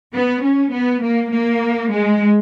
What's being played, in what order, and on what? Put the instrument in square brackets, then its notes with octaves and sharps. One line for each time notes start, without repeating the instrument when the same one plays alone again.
[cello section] B3
C#4
B3
A#3
A#3
G#3